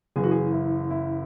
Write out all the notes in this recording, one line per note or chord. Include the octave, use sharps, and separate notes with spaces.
F#1 F#2 E3 G#4
F#4
G#4
E4
E4